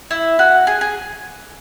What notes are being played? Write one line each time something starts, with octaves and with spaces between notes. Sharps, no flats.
E4
F#4
G#4
G#4